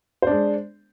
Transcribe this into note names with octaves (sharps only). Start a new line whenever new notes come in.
G#3 D4 C5